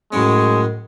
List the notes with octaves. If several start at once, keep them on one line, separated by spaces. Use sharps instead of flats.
F#2 A2 G#3 C#4